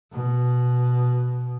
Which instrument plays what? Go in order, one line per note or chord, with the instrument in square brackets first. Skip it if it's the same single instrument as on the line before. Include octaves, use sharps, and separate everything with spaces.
[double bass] B2